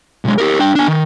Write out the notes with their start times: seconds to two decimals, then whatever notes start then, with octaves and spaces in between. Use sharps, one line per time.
0.25 B1 G#3
0.38 G4 A#4
0.59 D4 G5
0.75 D4 G#5
0.88 D#3